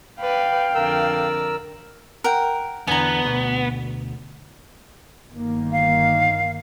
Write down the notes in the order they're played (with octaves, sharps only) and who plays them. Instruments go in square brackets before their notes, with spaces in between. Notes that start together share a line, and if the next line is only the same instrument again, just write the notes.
[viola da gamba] B4 D5 [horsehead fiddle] F5 G5
[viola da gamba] F2 D3 D5 [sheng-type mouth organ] A#4 E6
[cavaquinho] A#4 F#5 G5
[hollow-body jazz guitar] E2 D3 [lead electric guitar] B3 [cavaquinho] G#5 A#5
[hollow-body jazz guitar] D2 B2
[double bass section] G1 D#3 A#3
[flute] F5